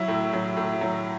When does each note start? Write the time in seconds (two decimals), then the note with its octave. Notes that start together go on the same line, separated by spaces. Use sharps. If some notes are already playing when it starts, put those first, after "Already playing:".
Already playing: F#3 E4
0.08 A2
0.33 F#3
0.57 A2
0.81 F#3